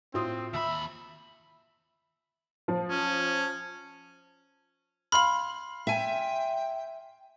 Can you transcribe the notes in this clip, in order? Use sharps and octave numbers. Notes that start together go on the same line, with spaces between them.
A2 C4 F4 D#6
D#2 E5 B5
F3
C#4
F5 B5 C6 F6 F#7
E5 G5 G#5